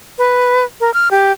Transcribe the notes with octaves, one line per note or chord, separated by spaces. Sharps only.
B4
A#4
F6
G4